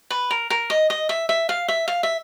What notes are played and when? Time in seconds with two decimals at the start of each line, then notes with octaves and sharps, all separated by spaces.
0.10 B4
0.31 A#4
0.50 A#4
0.70 D#5
0.90 D#5
1.09 E5
1.29 E5
1.49 F5
1.68 E5
1.88 F5
2.03 E5